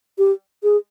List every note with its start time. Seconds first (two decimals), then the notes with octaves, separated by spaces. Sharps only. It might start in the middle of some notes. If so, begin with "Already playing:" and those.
0.18 G4
0.63 G#4